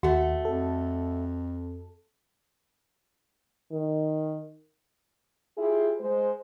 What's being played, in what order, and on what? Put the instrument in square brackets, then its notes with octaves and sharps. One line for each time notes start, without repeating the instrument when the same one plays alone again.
[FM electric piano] D#2 [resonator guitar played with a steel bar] A3 F#5 [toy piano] F#4
[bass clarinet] F2 [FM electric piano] A4
[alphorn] D#3
[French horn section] E4 F4 G4 G#4
G#3 C5